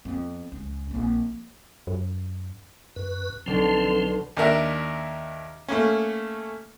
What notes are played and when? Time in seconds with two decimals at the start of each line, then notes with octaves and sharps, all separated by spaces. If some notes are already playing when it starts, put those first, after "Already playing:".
0.05 F2 B3
0.52 C#2
0.91 A#1 C4
1.87 F#2
2.96 F#2 B4
3.46 B1 D3 F3 C4 A5
4.37 D#2 D4 A#4 E5
5.68 A3 A#3 C#4